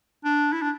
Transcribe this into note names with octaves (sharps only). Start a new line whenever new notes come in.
D4
E4
D4